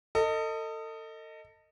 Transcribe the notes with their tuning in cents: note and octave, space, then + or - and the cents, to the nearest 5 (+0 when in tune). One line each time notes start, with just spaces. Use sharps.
A4 +35 D#5 +0